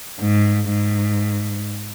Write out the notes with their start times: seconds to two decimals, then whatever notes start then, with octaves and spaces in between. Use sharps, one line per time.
0.20 G#2
0.70 G#2